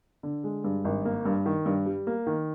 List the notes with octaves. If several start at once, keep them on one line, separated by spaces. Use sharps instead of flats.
D3
G#3
G2
G#1
A#3
G2
D#3
G2
G3
A#3
D#3